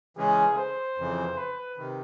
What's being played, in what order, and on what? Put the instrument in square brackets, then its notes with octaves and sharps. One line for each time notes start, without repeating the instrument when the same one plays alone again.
[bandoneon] C#3 E3 G#3 C#4 [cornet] G#4
[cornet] C5
[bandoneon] F2 C#3 E3
[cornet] B4
[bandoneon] C3 D#3